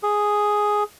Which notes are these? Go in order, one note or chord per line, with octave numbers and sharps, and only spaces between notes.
G#4